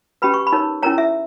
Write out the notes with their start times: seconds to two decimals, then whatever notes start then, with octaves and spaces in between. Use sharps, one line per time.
0.22 C#4 G4 B4 B5
0.34 C#6
0.47 B5
0.52 D#4 A#4 C#5
0.82 C#4 E4 A#4 C#5 A#5
0.98 E5